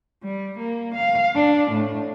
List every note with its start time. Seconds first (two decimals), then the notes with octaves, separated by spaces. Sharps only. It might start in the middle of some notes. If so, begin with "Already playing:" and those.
0.24 G3
0.59 A#3
0.95 F5
1.35 D4
1.72 A2